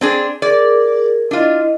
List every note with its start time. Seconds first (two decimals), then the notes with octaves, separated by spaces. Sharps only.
0.01 C4 D4 G#4
0.42 G#4 A#4 D5
1.31 D4 E4 F4 D#5